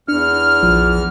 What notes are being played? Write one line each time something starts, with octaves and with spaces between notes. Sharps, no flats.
E2 D4 F6
A#1 F3